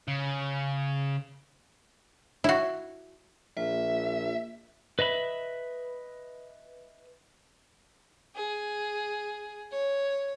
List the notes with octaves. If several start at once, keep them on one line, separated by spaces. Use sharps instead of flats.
C#3
E4 F#4
A#1 A#3 F4 E5
B4 D#5 E5 B5
G#4
C#5